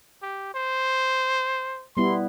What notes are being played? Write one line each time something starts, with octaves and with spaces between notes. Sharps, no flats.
G4
C5
G3 B3 E4 C6